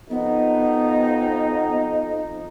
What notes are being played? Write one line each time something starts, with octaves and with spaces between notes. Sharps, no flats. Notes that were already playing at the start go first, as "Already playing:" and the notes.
F2 B3 D#4